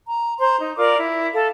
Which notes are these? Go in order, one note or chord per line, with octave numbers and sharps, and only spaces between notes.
A#5
C5 A#5 C6
D#4
F4 A#4 D5 D6
E4
A4 F5